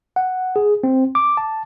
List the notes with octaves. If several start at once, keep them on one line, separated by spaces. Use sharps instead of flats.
F#5
G#4
C4
D6
A5